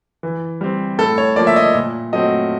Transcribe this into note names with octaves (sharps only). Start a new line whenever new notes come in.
E3
G3 C4
A2 A4
C#5
F3 A#3 D5
E5
D#5
A#2
F#3 A3 C4 D#5